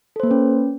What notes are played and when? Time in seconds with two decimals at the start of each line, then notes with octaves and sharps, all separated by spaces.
0.16 A4
0.20 C5
0.23 A#3
0.27 B4
0.31 C#4